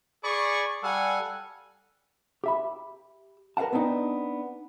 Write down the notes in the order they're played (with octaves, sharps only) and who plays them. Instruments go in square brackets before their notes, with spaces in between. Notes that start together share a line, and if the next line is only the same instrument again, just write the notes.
[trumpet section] G#4 C#6 [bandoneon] D5 B5 D6
[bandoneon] G3 A4 [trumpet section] F5 F#5 G#5
[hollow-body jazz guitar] G4 E5 B5
A#4 B4 F5 F#5 A5
B3 C4 D4 D#4